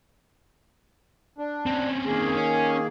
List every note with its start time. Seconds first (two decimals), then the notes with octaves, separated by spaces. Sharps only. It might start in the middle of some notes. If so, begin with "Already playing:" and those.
1.38 D4
1.66 C4 C#4
2.06 D#3 A#3 G#4
2.37 C#4